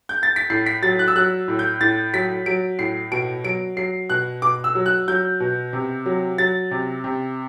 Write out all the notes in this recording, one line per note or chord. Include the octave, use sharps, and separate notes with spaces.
G6
A6
B6
A2 C7
B6
F#3 A6
F#6
E6
F#3 F#6
A2
G6
A2 A6
F#3 B6
F#3 D7
A2 C7
B2 D7
F#3 D7
F#3 C7
B2 F#6
B2 D6
E6
F#3
F#6
F#3 G6
B2
C3
F#3
F#3 A6
C3
C3